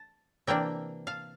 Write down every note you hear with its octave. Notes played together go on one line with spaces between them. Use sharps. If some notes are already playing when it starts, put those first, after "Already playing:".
Already playing: A5
C3 E3 A#3 D4 E5 G5
F5 A5